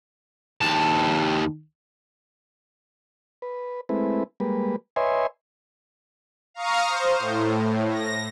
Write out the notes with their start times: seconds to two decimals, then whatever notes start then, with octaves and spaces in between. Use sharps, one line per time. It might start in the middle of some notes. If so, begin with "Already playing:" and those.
0.61 D#2 A5
3.42 B4
3.89 G#3 A3 C4 E4 B4
4.40 G3 G#3 A#3 B4
4.96 B4 C#5 D#5 E5 G#5 C6
6.54 F5 A#5 C#6 D#6 F6
6.88 C5
7.19 A2
7.90 A#6